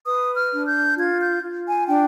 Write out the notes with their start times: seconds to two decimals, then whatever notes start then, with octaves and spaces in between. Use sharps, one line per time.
0.06 B4 D#6
0.36 F6
0.51 D4
0.66 G6
0.96 F4 G#6
1.20 G6
1.43 F4
1.66 G#5
1.88 D4 G5